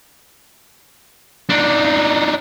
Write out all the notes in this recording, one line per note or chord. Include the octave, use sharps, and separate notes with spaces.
D4 D#4